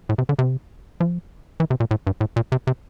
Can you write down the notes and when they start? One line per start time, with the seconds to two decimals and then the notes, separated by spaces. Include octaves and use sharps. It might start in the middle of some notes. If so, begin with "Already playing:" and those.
0.09 A2
0.18 C3
0.29 D3
0.39 C3
1.00 F3
1.60 E3
1.70 C3
1.80 A#2
1.91 A2
2.07 G2
2.21 A2
2.36 A#2
2.52 C3
2.67 C3